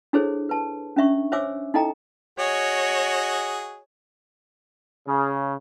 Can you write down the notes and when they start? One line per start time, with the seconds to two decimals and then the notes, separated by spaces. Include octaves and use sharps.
0.13 D4 E4 G#4 A4 C5 C#5
0.49 B4 A5
0.96 C#4 D4 E5 C#6
1.32 C5 C#5 E5 G#5 D6 E6
1.74 D#4 E4 A4 D#5 G5 A#5
2.39 F#4 G#4 C#5 D#5
5.07 C#3